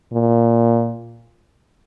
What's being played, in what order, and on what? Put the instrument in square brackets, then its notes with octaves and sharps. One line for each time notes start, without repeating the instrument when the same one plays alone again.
[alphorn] A#2